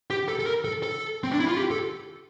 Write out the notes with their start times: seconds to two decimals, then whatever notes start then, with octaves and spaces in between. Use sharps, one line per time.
0.10 G4
0.28 A4
0.39 A4
0.46 A#4
0.65 A4
0.83 A4
1.23 C4
1.31 D4
1.40 E4
1.48 F4
1.56 G4
1.71 A4